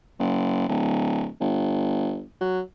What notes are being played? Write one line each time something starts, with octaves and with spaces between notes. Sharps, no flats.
F#1
D1
G1
F#3